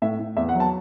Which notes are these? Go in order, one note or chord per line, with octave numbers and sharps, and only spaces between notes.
A2 E5
A2
E2 E5
F#5
F#3
A5